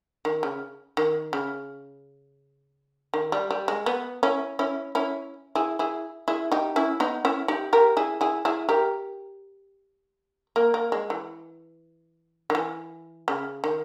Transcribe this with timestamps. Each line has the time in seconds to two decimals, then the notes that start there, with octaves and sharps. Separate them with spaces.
0.25 D#3
0.43 C#3
0.97 D#3
1.33 C#3
3.14 D#3
3.32 G3
3.51 G3
3.68 G#3
3.86 B3
4.23 C#4 E4
4.59 C#4 E4
4.95 C#4 E4
5.55 E4 G#4
5.79 E4 G#4
6.28 E4 G#4
6.52 D#4 G4
6.76 C#4 E4
7.00 B3 D#4
7.25 C#4 E4
7.48 D#4 G4
7.73 G4 A#4
7.97 E4 G#4
8.21 E4 G#4
8.45 E4 G#4
8.69 G4 A#4
10.56 A#3
10.74 A#3
10.92 G#3
11.10 E3
12.50 D#3
12.55 E3
13.28 C#3
13.64 D#3